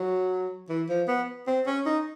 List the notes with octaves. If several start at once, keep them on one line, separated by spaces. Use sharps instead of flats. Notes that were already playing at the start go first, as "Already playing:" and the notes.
Already playing: F#3
E3
F3
B3
C4
C#4
D#4